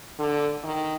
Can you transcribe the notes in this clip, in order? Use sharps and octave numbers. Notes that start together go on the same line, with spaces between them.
D3
D#3